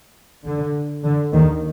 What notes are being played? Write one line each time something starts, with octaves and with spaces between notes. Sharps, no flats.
D3
D3
D#2 D#3